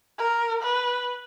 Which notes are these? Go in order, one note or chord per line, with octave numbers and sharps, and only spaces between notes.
A#4
B4